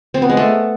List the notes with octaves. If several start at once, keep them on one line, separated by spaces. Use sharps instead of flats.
C4
B3
G#3
A3